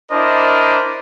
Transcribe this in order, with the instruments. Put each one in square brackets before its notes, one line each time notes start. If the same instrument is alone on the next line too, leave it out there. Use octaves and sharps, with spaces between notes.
[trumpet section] D4 E4 A#4 C5 D5 D#5